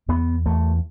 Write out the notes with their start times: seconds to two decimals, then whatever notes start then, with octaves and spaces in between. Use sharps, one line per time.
0.08 E2 B3
0.46 E2 A3